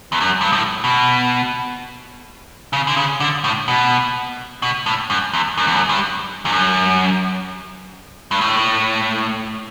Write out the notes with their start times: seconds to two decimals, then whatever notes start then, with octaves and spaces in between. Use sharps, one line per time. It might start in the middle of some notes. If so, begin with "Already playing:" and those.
0.12 E2
0.20 F#2
0.41 G2
0.52 A2
0.84 B2
2.73 C#3
2.87 D3
2.97 C#3
3.20 D3
3.44 A2
3.68 B2
4.62 B2
4.86 A2
5.10 F#2
5.33 E2
5.57 F#2
5.67 E2
5.76 F#2
5.89 G2
6.45 E2
6.52 F#2
8.31 G2
8.41 A2